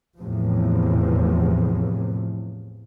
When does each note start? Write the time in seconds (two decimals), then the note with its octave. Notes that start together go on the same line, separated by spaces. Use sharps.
0.20 E2 A2 C3 E3 F3